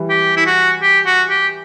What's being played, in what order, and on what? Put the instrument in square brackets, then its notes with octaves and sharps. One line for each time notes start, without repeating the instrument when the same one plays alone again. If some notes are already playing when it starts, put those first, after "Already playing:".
Already playing: [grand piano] E3 G3
[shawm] G4
E4
F#4
G4
F#4
G4